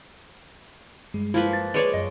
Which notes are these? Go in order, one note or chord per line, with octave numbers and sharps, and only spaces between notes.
G2 G#3
F3 A#3 E4 B4
A6
G#3 G#4 B4 C#5 D5 D6
F#2 D#5